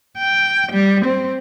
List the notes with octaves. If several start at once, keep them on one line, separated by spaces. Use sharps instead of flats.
G5
G3
C4